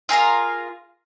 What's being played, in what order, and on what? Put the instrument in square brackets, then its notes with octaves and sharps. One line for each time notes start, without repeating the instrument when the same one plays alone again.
[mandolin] F4 G#4 A#4 F5